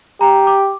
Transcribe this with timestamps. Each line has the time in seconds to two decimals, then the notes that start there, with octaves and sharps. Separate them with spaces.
0.21 G4 A#5
0.47 D6